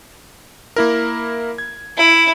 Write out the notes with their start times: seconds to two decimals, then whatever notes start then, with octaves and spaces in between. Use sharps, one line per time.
0.76 A#3 E4 A#4
1.58 G#6
1.97 E4